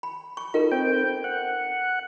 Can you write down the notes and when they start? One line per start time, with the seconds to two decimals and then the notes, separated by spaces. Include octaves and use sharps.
0.03 B5
0.37 C#6
0.54 D#4 F4 A4 A#4
0.72 C4 G5
1.24 F#5